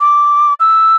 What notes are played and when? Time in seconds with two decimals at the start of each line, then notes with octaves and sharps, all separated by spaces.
0.01 D6
0.60 E6